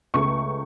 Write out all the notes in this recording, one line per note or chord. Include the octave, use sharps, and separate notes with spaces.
C#2 C#3 A3 C#6